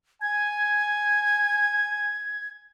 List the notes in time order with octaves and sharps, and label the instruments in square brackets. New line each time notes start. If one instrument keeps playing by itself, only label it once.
[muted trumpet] G#5 [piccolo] G#6